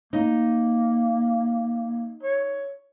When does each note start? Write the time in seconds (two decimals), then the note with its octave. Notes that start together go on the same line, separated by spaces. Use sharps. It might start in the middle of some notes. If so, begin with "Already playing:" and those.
0.13 A#3 D#4
2.23 C#5